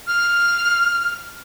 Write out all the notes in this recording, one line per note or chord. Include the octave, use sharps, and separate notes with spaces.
F6